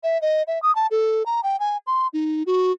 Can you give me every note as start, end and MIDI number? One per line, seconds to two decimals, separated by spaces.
0.03 0.20 76
0.22 0.43 75
0.47 0.61 76
0.62 0.74 87
0.75 0.87 81
0.91 1.25 69
1.26 1.41 82
1.43 1.59 79
1.60 1.77 80
1.87 2.07 84
2.13 2.43 63
2.46 2.72 66